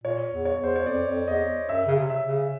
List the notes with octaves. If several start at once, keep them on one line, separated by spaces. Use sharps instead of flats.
A#2 C#5
E2
C#5
E2 C5
C#5
F2 D5
F2
E2 D#5
F#2 E5
C#3
C3
E5
C#3